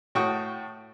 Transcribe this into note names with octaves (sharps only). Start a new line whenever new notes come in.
A2 F#4 G5 C#6 D#6